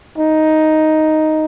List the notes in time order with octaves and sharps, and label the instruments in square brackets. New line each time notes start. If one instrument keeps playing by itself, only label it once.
[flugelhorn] D#4